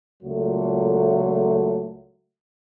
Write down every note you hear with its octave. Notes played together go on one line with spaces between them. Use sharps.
C#2 A#2 F#3 A3